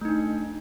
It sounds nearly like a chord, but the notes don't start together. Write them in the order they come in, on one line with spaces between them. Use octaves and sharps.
A3 D#4 D4